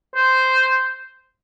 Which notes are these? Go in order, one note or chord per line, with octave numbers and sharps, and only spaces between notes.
C5